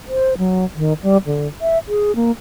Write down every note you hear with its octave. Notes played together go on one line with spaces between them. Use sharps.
C5
F#3
D#3
G3
D3
E5
G#4
A#3